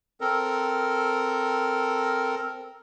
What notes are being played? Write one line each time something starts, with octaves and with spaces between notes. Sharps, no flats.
C4 A4 A#4